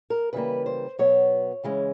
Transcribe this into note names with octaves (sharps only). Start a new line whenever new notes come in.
A#4
C#3 E3 G3 A#3 B4
C5
B2 F#3 B3 C#5
C#3 E3 G#3 C#4